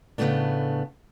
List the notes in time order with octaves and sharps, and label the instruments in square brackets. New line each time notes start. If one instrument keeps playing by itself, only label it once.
[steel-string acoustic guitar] A2 C#3 E3 A3 B3 D4